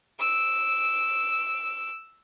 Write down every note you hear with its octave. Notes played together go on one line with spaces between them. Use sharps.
E6 D7